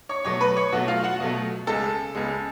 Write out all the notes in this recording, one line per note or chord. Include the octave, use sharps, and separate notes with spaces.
C#5 C#6
B2 F#3 A3 C#5 C#6
B4 B5
C#5 C#6
B2 F#3 A3 F#4 F#5
F4 F5
F#4 F#5
B2 F#3 A3
C#2 C#3 G#3 A4 A5
C#2 C#3 G#3